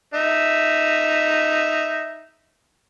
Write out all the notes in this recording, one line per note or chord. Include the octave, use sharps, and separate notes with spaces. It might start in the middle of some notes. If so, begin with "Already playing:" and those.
D#4 E5